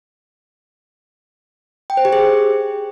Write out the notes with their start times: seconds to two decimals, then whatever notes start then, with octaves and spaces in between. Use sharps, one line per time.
1.90 G5
1.97 C5
2.05 G4
2.13 G#4